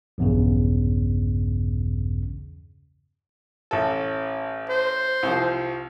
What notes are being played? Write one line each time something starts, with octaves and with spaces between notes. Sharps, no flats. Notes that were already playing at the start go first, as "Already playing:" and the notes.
A#1 E2 G2 C#3
A1 A4
C5
C2 F3